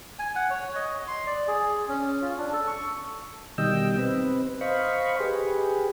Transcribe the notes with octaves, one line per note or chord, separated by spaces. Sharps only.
G#5
F#5
C#5
D#5
C6
D5
G#4
C#4
F4
D4
A4
C#6
B2 D#3 G3 D#5 G5 E6
C4 B4
C5 D#5 F5 B5 C#6
G4 G#4 B4